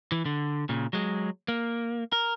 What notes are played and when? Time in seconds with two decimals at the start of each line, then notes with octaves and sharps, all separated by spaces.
0.12 E3
0.26 D3
0.69 A#2 C#3
0.93 F#3 G#3
1.48 A#3
2.13 A#4